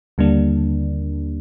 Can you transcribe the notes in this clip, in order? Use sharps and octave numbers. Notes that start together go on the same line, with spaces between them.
D#2 D3 G3 A#3 D4